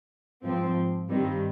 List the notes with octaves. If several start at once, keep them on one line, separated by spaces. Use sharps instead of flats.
G#2 F3 C4
G2 D#3 G3 C4